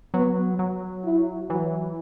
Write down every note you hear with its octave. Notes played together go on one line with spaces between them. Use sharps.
F#3 B3
F#3
E4
E3 F#3